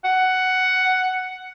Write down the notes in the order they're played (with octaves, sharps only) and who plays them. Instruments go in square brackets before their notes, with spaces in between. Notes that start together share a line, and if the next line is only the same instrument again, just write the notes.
[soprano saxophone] F#5